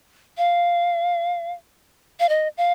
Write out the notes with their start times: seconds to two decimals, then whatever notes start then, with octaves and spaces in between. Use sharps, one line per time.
0.38 F5
2.20 F5
2.29 D#5
2.57 F5